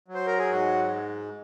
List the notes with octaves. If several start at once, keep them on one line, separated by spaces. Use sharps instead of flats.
F#3
C5
A#4
G#4
G#2 F#4